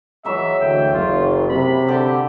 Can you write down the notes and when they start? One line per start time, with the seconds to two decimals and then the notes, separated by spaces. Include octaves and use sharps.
0.25 E3 F#3 G#3 E5
0.60 D2 G5
0.93 F#1 F4
1.49 C3 B5
1.88 D3 G4